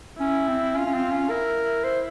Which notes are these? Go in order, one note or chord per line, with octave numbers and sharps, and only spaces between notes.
C#4 E4
C4
C#4 F4
C#4
C4
C#4
E4 A#4
C5